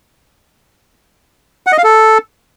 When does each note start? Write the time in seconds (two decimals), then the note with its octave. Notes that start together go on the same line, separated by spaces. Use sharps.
1.67 F#5
1.72 D#5
1.78 F5
1.84 A4